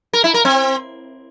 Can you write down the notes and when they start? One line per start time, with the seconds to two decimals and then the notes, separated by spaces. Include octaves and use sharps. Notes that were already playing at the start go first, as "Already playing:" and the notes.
0.13 A#4
0.24 E4
0.34 A#4
0.45 C4